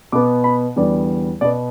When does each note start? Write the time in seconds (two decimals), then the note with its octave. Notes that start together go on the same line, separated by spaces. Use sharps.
0.12 B2 B3 D6
0.44 B5
0.76 E2 D3 G3 B3 D5
1.41 B2 B3 D5